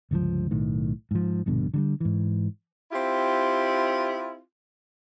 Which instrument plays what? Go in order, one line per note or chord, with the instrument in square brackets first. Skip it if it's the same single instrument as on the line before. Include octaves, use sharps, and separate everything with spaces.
[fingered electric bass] G1 C#2 C#3 F3
B1 A2 D#3
G#2 F3
A#1 G2 B2 D3
D3 F#3 G3
G#2 E3
[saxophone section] C4 E4 F4 G4